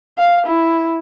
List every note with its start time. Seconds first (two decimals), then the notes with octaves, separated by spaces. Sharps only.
0.18 F5
0.46 E4